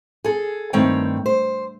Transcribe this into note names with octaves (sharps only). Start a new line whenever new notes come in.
G#4 A4
G2 D#3 A3 C4 C#5 G5
C5